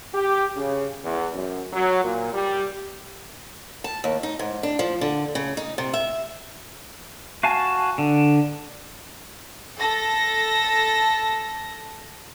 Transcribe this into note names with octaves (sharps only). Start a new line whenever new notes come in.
G4
C#3
E2
F#2
F#3
A#2
G3
A5
D#2
D#4
G#2
D4
F3
D3
C#3
D#4
C3
E5
F#4 F5 G#5 A5
D3
A4 A#6